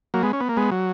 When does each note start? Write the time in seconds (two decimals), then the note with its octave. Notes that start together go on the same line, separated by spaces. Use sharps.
0.14 F#3 A#3
0.23 G#3 B3
0.33 C#4
0.40 B3
0.49 A#3
0.57 G#3 B3
0.71 F#3